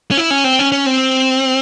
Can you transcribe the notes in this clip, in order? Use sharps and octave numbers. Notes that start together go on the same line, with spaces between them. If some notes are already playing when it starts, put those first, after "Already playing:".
C#4
E4
C#4
C4
C#4
C#4
C4